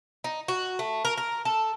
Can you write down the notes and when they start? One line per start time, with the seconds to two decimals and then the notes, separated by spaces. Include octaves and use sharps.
0.24 D#4
0.48 F#4
0.79 A3
1.05 A#4
1.18 A#4
1.45 A4